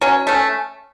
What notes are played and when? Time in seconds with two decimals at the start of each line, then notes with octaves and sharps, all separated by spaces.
0.01 F#3 C#4 C#5
0.27 A3 C#4